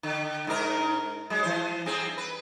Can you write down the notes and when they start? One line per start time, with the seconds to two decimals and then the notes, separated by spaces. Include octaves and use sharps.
0.03 D3
0.47 G#2 D4 A#4
1.30 F#3 G#3
1.43 E3 C5
1.86 G2 C4 G#4
2.18 B4